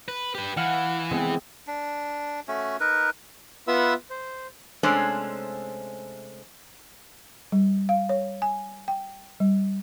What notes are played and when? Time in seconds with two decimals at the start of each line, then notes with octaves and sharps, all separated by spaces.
0.08 B4
0.35 G4 B4
0.57 E3 F5 F#5 F6
1.11 G#3 B3 C4
1.67 D4
2.48 A3 C#4 F#4
2.80 D#4 A#4 B4
3.68 B3 F4 B4 E5 F#5 E6
4.10 C5
4.83 C3 G#3 A3 C#4 D4 C5
7.52 G3
7.89 F5
8.09 C#5
8.42 G#5
8.88 G5
9.40 G3